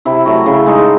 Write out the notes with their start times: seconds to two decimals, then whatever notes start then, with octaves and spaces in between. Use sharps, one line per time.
0.05 C3 E4
0.25 F#3 A3 F#4
0.46 C#3 E4
0.66 G#3 D#4